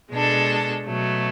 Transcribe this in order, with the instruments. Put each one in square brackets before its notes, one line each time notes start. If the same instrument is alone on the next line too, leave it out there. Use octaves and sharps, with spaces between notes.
[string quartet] B2 G#3 D4 A4
B2 F#3 A3